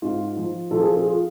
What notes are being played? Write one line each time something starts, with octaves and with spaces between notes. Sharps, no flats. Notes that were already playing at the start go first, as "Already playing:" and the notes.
G#2 F4
F3
F3 A4
G#4
F4
G#4
F4